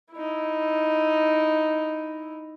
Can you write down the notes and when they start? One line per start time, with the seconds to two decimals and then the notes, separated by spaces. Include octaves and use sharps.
0.13 D#4 E4